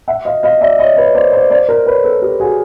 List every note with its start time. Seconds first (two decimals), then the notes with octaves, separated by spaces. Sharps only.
0.08 E5 F#5
0.25 D#5 F5
0.43 D#5 F5
0.61 D5 E5
0.79 C#5 D#5
0.97 B4 C#5
1.15 C5 D5
1.32 C5 D5
1.51 C5 D5
1.69 A#4 C5
1.86 B4 C#5
2.04 A4 B4
2.22 G4 A4
2.40 F#4 G#4